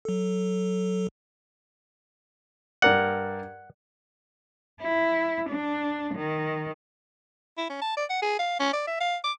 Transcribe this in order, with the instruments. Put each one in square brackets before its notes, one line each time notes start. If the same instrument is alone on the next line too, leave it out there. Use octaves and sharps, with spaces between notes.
[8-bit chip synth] F#3 A4
[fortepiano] G2 A#4 D5 [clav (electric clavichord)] F#5
[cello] E4
D4
D#3
[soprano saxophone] E4
C#4
A5
D5
F#5
G#4
F5
C#4
D5
E5
F5
D6